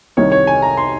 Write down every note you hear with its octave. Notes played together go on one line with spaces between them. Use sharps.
C2 C3 D#3 G3 C#5
C#5
G#5
A#5
C6